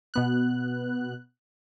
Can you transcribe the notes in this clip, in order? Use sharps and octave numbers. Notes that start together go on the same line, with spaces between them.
B2 B3 F#6